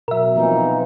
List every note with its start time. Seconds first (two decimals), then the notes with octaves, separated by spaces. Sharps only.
0.08 B2 F#3 A#4 E5
0.36 E3 F3 A#3 C4 D#4